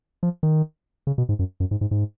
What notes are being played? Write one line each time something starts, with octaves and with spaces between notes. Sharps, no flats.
F3
D#3
C#3
B2
G#2
F#2
F#2
G#2
G#2
G#2